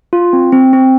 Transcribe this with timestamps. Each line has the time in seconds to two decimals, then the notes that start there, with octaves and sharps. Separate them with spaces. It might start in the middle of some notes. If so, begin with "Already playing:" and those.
0.13 F4
0.33 C4
0.52 C4
0.73 C4